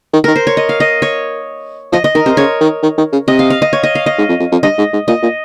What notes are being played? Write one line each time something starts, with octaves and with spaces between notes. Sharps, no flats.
D#3
D#3 A#4
C5
C#5
D#5
F5
D#5
C#5
F3 D#5
D#5
D#3 A#4
C3 C5
C#3 C#5
D#3
D#3
D#3
C#3
C3 D#5
F5
F5
D#5
C#5
D#5
F5
D#5
G#2
F2
F2
F2
G2 D#5
G#2
G#2
A#2 D#5
A#2